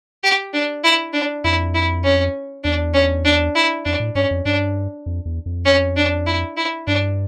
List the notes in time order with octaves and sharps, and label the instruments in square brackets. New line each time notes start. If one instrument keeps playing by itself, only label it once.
[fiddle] G4
D4
E4
D4
[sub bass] F2 [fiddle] E4
[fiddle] E4
C#4
[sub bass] E2 [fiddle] D4
[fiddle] C#4
D4
E4
[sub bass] F2 [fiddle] D4
[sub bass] A2
[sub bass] G2 [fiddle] C#4
[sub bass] F2
[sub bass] G2 [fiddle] D4
[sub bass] F2
E2
F2
[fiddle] C#4
D4
E4
E4
[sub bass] G2 [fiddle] D4